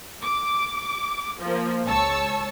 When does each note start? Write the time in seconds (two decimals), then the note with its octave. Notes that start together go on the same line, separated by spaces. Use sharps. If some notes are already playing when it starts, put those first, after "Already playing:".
0.22 D6
1.39 F3 A#3
1.85 C#2 C#5 A5 C#6 E6